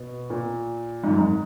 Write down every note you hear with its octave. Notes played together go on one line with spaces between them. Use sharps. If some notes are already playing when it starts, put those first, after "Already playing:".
Already playing: B2
A#2
G#2
F#2
G#2